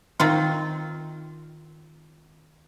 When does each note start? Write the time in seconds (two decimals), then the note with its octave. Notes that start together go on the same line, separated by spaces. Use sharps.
0.20 D#3 C4 F4